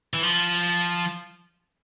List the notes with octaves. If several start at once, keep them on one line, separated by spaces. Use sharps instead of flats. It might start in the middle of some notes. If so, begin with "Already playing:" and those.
E3
F3